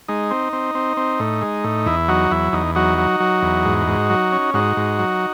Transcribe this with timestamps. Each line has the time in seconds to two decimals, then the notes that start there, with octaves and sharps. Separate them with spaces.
0.08 G#3 D#4
0.31 C4
0.53 C4
0.75 C4
0.97 C4
1.20 A2
1.41 G#3
1.64 A2
1.86 E2 E4
2.08 F#3 D#4 F#4
2.31 E2 E4
2.53 E2 D#4
2.75 F#3 D#4 F#4
2.98 F#3
3.20 F#3
3.42 E2
3.65 G#2
3.87 G#2
4.10 F#3
4.32 C#4
4.54 G#2 D#4 F#4
4.77 G#2
4.99 F#3